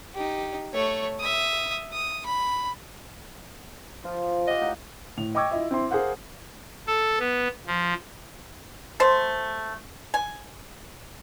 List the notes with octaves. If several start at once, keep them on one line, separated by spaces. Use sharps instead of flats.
D#4 G4
A3 C#5
E5 D#6
D#6
B5
F3 F4
G4 D#5 F5 F#5
A2 D#4 F#5
A2 F7
D#5 G5 C#6 D6 E6 G#6
E4 F4 D#5 E5
C4 E4 C6
G#4 A#4 C5 F5 F#5
A4
B3
F3
A3 C5
G#5